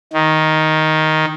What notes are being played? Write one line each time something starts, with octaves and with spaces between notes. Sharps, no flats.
D#3